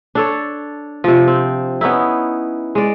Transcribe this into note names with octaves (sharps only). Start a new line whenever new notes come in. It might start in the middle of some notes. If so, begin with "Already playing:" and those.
D4 A4 C#5
C3 F3
C4
B3 C#4 D#4 E4
G#3 D5